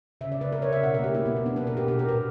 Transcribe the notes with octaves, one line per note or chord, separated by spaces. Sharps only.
C#3 E5
D5
C#3 B4
C#3 A#4
C#5
C#3 E5
B2 F#5
A#4
A#3 G4
A#3 E4
B3
B2
B3
A#3 D4
B4
B2
A#4
B2 G4
G4
B2
A#4
A#2 B4